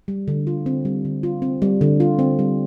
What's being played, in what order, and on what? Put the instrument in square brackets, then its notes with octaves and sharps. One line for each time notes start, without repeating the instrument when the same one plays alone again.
[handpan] G3
D3
F4
C4
G3
D3
F4
C4
G3
D3
F4
C4
G3